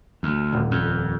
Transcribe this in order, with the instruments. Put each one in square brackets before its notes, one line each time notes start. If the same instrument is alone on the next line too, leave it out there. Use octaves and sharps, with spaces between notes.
[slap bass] D2
[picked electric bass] D#1
[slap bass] F2